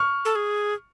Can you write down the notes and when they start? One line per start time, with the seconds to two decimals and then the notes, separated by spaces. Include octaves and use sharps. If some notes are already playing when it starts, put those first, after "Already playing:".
Already playing: C#6 F6
0.25 A4
0.35 G#4